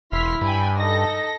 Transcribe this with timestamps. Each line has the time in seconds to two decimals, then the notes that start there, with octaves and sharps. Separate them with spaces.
0.12 E1 E4 C6 F6 B6
0.41 G2 G5 G#5 B5
0.78 D#4 A4 A#6